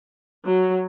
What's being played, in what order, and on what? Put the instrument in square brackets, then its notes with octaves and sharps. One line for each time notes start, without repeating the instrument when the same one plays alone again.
[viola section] F#3